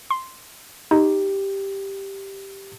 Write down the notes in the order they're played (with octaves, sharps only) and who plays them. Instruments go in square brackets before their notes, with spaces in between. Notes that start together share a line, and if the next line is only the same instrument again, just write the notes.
[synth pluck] C6
[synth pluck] D#4 [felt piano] G4